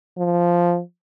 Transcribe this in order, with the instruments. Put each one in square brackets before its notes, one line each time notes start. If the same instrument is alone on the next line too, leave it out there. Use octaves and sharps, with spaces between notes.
[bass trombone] F3